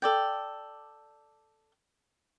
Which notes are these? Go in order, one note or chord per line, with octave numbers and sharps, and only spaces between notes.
A4 D5 G5